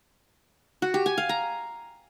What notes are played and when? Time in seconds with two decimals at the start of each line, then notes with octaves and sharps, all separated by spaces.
0.82 F#4
0.94 G4
1.06 G#5
1.18 F5
1.29 A#5